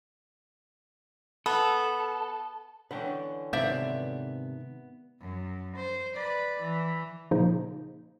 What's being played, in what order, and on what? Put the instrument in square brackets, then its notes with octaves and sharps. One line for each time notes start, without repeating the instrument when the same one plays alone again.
[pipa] B3 [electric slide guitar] A4
[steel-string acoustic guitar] D3 E3 C#4 [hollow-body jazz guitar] B4 F#5 G5
[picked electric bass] G#2 C3 D#3 [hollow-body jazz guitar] B3 B4 [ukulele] C5 D5 E5
[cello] F#2
C5
B4 D5
E3
[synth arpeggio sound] A#2 C#3 F3 A#3 D#4